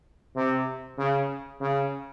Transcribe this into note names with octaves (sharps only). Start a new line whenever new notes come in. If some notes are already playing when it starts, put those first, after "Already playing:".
C3
C#3
C#3